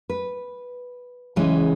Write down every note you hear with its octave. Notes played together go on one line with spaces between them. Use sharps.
B4
C#3 E3 G#3